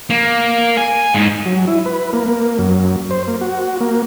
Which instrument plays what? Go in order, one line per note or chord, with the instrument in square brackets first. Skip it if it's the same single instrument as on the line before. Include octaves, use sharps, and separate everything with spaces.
[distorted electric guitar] A#3
G#5
G#2
[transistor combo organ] F#3
E4
B4
A#3
A#3
F#2
C5
A#3
F#4
A#3